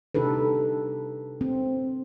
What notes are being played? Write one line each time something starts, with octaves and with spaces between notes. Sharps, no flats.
C3 D4 D#4 G4 A4 B4
C4